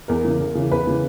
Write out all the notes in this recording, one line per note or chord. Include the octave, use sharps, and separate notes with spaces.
E2 A#4
C#3 E3
E2
C#3 E3
E2 B4
C#3 E3